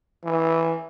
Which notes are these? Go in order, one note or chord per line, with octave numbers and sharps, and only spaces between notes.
E3